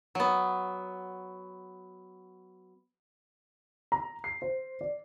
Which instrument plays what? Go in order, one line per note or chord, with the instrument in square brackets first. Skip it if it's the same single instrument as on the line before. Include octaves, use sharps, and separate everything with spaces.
[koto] F#3 B3
[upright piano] A#5
C7
C5
D5